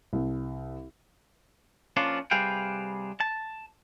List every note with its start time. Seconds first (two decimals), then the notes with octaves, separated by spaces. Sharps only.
0.13 C2
1.97 F3 A#3 C#4 D4 F4
2.31 C3 G3 G#4 B4 F5 G5
3.20 A5